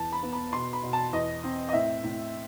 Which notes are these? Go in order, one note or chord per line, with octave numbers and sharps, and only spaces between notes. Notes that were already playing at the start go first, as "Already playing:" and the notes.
Already playing: E2 A5
B5
B3
B5
B2 C6
B5
B2
A5
E2 D#5
C4
D#5
A2 E5
A2